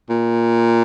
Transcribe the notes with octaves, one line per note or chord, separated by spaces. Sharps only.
A#2